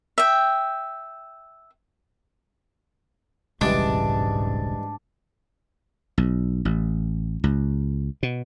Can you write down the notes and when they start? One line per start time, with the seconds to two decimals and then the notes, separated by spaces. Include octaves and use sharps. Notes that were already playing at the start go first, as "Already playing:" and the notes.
0.18 E5 G5
3.61 D#1 B1 G#2 C#3 E3 G3 G#3 D4
6.18 B1
6.65 A1
7.44 C#2
8.23 B2